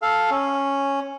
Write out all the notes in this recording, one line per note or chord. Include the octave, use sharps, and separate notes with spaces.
A4 F5
C#4